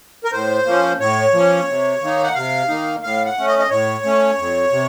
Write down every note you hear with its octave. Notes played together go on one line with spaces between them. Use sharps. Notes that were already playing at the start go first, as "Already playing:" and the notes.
A#4
A2 C5
F3 A#3 C#4
A2 C#5
F3 A#3 C#4
C3
D#3 A#3 D#4
F#5
C3 F5
D#3 A#3 D#4
A2 F5
F#5
A3 C#4
D#5
D#5
A2 C#5
A3 C#4
F2
C3